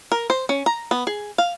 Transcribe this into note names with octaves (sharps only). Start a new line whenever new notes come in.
A#4
C5
C#4
A#5
B3
G#4
F5